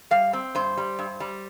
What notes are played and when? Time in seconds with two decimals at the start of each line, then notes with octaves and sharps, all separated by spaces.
0.11 G3 F5
0.33 C4
0.55 G2 C5
0.77 G3
0.99 G2
1.20 G3